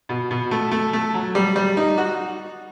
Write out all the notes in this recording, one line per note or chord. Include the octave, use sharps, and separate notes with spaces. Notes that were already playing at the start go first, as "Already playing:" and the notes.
B2
B2
A3
A3
A3
F#3
G3
G3
D#4
F#4